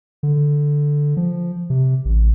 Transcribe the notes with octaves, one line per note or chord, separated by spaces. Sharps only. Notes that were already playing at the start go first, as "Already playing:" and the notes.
D3
F3
C3
A1